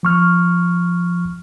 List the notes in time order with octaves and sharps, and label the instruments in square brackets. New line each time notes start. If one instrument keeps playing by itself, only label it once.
[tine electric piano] F3 C#6 F6